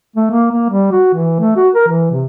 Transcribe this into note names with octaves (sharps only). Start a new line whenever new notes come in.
A3
A#3
A#3
G3
F#4
E3
A3
F#4
A#4
E3
C3